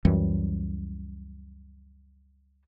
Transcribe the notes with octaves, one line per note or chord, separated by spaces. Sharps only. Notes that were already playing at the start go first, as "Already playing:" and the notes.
C#2 F#2 E3 G3